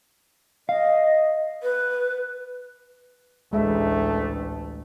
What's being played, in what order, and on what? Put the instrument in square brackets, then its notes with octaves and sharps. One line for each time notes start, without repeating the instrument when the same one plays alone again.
[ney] D#5 [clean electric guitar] F5
[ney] B4
[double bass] A1 D2 [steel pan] G#3 E5 [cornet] A3